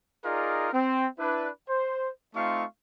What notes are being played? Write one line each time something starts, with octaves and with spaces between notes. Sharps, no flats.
D#4 F4 G#4 A#4 D5 D#5
C4
D4 E4 B4
C5
A3 C4 D#4 F4 F5 C#6